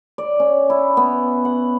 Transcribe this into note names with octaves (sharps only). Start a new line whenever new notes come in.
D5
C#4
E4
B3
F#5